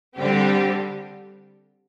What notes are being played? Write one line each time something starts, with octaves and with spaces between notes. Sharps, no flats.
D3 G3 C4 G4